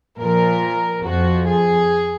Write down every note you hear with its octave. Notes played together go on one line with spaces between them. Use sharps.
A#2 F3 A#4
F2 F3 F#4
G#4